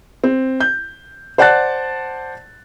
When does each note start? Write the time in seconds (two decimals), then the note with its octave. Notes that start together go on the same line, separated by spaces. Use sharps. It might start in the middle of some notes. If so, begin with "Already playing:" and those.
0.24 C4
0.60 G6
1.38 C5 D5 F#5 A5 F#6 A6